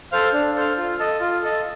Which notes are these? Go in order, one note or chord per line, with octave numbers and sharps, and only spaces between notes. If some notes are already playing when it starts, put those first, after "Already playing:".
A4 C5 F5
D4
A4 C5 F5
F4
A4 D#5 A5
F4
A4 D#5 A5